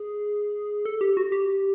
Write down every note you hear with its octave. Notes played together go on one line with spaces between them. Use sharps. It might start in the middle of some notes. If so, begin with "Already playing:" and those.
Already playing: G#4
A4
G4
F#4
G4